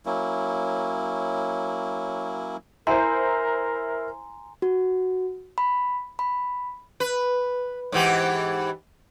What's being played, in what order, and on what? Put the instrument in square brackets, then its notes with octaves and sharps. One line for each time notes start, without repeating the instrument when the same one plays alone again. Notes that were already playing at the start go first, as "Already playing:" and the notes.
[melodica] F#3 A#3 C#4 E4
[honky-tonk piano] E4 C5 [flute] A#4 [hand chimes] G#5 A#5 C6
[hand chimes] F#4
B5
B5
[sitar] B4
G#2 E3 G4